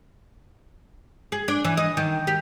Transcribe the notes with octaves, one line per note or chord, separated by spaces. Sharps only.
G#4
D4
E3
D#5
D#3
G4